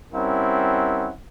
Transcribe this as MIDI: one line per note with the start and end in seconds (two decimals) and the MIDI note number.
0.13 1.10 55
0.13 1.10 60
0.13 1.10 61
0.13 1.10 64
0.13 1.10 70
0.13 1.10 78